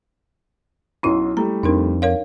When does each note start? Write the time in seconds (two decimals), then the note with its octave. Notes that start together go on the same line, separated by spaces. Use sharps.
1.03 B1 F#3 C#4 E4 C6
1.37 G3 A3 A#5
1.63 F2 D4 D#4 A#4
2.02 A#4 C#5 F5